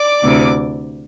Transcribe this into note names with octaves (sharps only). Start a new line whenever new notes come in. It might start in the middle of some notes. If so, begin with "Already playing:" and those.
Already playing: D5 D6
D2 C3 E3